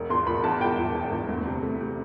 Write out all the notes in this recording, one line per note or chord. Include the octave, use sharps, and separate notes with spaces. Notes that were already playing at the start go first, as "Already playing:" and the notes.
Already playing: E1
E2 C6
E1 B5
E2 A5
E1 G5
E1
E1
E2
D2
C3
A3
C3